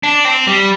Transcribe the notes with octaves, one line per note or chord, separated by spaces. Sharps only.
D4
C4
G3